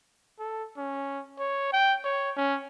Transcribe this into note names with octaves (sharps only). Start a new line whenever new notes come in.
A4
C#4
C#5
G5
C#5
C#4